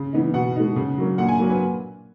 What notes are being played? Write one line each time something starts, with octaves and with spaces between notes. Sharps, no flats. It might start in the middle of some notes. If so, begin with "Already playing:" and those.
Already playing: C#3
E3 B3 D#4
B2 F#5
G#3 D#4
C#3
F#3 A#3
A#2 F#5
G#5
F#3 A#3
B4